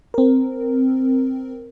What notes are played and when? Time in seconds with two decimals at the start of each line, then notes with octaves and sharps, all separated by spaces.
0.14 C4 A#4